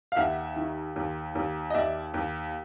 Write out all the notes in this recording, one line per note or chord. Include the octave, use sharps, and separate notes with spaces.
F5
D#2 E5 F#5
D#3
D#2
D#2
D#5
D#2 D5 E5
D#2